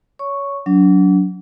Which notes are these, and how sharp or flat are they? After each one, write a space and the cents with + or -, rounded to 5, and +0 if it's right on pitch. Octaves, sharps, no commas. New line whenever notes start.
C#5 +20 C#6 +0
F#3 +0 D4 -35